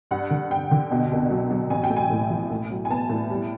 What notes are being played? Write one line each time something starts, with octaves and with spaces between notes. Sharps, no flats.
G2 F#5
D3
G2 G5
D3
B2
C2
F#3
F#3
A1 G#5
G5
A3
G#5
A2
F3
A2
F#3
G#5
B3 A5
A2
G3